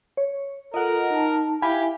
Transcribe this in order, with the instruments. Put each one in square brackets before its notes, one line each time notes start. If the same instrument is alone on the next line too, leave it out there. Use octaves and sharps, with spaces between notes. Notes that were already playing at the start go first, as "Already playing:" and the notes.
[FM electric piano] C#5
[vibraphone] F4 A4 [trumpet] A#4 [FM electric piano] D#5 F#5
[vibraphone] D#4 A5
[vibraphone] E4 E5 [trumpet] G4 [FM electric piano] F5 G#5 B5